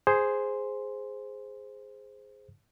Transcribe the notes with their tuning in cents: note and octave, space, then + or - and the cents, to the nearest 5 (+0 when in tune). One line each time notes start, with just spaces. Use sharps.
G#4 +0 C5 +0